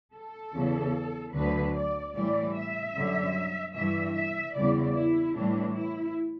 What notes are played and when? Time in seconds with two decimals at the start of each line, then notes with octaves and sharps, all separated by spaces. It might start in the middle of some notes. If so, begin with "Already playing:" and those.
0.14 A4
0.54 E2 C#3 E3
1.34 D2 D3 F#3 B4
1.75 D5
2.14 A2 E3 G3 D5
2.55 E5
2.95 F#2 D3 G3
3.74 G2 E3 G3 E5
4.15 E5
4.55 E2 C#3 E3 G3 D5
4.95 E4
5.35 A2 E3 G3 D4
5.75 E4